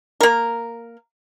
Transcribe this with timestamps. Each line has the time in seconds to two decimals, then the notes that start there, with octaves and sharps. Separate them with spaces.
0.21 A#3 A#4